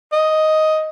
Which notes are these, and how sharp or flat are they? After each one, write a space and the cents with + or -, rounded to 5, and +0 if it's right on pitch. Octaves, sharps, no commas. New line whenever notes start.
D#5 +5